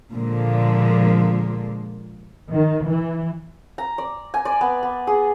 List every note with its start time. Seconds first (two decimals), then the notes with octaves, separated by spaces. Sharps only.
0.12 A#2 D3 F3 G#3 A#3
2.51 D#3
2.87 E3
3.78 A#5
3.98 D5
4.34 G#5
4.45 D5
4.61 B3
4.83 B3
5.07 G#4